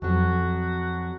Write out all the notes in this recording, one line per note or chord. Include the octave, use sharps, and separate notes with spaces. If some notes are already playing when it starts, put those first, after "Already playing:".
F2 F#3 F#4